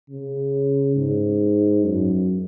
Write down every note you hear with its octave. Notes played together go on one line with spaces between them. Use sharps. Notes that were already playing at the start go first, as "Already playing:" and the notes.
C#3
G#2
F#2